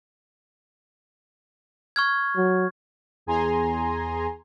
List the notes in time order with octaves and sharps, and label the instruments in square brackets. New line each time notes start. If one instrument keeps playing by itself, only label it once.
[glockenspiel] C#6 F6 G#6
[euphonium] F#3
[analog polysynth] E2 G#4 G#5 A#5 C6